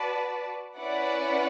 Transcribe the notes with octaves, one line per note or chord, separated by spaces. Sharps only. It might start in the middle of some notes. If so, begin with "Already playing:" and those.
Already playing: F#4 B4 D5 A5
C#4 E4 B4 D5 F#5